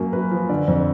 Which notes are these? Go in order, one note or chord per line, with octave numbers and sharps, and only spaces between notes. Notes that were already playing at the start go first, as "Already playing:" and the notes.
Already playing: F#2 A#3 A#4
F#2 B4
F3
D3 D5
F2